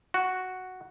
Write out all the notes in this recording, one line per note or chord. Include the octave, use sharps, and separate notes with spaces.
F#4